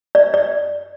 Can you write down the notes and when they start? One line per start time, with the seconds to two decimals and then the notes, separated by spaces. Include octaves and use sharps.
0.15 D5
0.34 D5